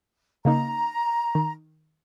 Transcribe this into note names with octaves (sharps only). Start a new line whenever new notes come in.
C#3 A#3 D#4 A#5
D#3